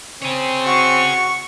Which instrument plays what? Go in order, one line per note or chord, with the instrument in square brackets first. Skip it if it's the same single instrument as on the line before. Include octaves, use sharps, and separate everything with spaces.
[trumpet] C4 [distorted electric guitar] G#4 C#5
[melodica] F#4 [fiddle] C#6